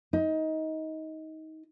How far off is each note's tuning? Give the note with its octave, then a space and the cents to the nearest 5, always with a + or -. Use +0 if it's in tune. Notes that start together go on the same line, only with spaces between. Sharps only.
D#4 +20